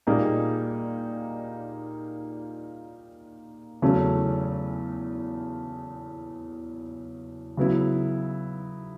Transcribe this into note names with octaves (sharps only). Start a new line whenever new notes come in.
A#2 G3 A#3 D#4 G#4
E2 C#3 F#3 A3 C#4
C#3 F#3 B3 E4